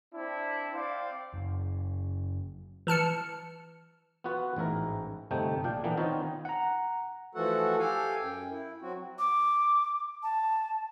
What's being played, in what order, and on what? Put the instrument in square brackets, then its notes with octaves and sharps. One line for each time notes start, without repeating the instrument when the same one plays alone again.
[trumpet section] C4 D4 E4
C4 C5 D5 F5
[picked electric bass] F#1
[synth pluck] E3 A5 F6 C#7
[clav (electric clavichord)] B3 F4 F#4 B4
A1 G#2 E4 A#4
G1 C3 A3 D#4 G5
A#1 A#2 D4 F5 G5
D3 E3 A#3 B3 D4
D#3 B3 C4 D#4 F4 C#5
[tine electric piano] F#5 A#5
[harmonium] E3 F3 A3 F#4 A4 F#5
G4 A4 F5 G#5
F#2 G5
E4
F#3 C4 F#4
[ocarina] D6
A5